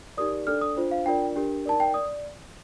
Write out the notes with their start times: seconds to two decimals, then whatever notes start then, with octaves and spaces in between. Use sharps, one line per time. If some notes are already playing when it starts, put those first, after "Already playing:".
0.17 D#4 G4 A#4 D5 D#6
0.47 D4 A4 D5 F6
0.62 D#6
0.77 D4 F4 C5
0.91 F5
1.06 D4 F4 A#4 D5 G5
1.36 D4 G4 A#4
1.66 D#4 A#4 D5 A5
1.80 G5
1.94 D5 D#6